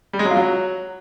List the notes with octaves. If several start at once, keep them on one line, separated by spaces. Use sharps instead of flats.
G3
G#3
F#3
F4
F#3